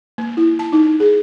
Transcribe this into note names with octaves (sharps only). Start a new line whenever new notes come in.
A#3
E4
A5
D#4
G#4